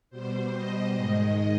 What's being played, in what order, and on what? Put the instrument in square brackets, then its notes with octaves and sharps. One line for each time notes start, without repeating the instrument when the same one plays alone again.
[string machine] B2 G3 C5
D#5
G#2 D#3 G#3